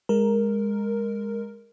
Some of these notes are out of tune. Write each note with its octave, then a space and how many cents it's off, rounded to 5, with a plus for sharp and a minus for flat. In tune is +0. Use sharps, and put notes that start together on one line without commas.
G#3 -15 A#4 +0